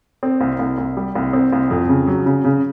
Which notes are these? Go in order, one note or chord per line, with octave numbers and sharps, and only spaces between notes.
C4
C2
C2
C2
G3
C2
C4
C2
F2
C#3
F#3
C#3
C#3